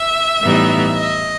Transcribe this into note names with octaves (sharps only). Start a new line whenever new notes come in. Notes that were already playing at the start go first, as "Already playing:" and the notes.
Already playing: E5
A2 E3 G3 B3 D#4
D#5